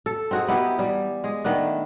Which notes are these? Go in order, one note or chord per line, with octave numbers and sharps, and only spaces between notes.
A4
C4 D#4 F#4 G#4
B3 D#4 E4 G4
E3 G3
G#3 G#4
D#3 A3 B3 D4